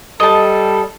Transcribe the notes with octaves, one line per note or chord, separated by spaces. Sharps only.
G3 A4 D#5 A5